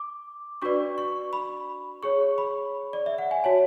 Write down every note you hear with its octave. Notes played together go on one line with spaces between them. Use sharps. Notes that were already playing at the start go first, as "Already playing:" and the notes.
Already playing: D6
D4 F#4 B4 D5 C#6
C#6
B5
G#4 C#5 C#6
B5
D5
E5
F#5
G#5
F#4 C#5 A5